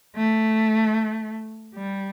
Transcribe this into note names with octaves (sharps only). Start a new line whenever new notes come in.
A3
G3